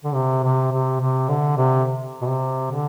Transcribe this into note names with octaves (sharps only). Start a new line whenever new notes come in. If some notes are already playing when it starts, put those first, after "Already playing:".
D3
C3
C3
C3
C3
D3
C3
B2
C3
D3